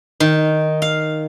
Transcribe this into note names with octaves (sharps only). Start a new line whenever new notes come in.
D#3
F5